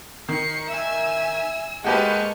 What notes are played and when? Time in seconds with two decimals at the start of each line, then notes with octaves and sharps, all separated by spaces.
0.29 D#3 C7 C#7
0.68 E5 G#5 E6
1.84 G#3 A#3 F#4 G4 B4 A5 C#6 F6